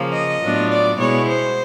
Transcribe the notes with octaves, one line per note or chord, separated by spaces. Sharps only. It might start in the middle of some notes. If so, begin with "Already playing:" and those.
Already playing: C#3 F3 A#3
D#5
A2 F#3 B3 D4 F4
D5
B2 G#3 B3 E4 C#5
C5